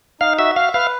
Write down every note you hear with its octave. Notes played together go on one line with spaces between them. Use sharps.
D#4 F5
F#4 E5
E5 F5
B4 F5